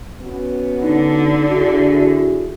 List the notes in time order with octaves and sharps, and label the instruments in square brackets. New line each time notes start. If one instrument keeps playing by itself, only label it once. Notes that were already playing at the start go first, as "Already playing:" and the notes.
[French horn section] B3 C#4 F#4
[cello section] D3 [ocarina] D#4
[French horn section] D4 E4 G#4 [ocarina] F#4